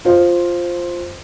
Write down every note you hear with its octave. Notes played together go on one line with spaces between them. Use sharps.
F4 C5